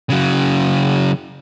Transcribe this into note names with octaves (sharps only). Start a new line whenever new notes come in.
C#3 F#3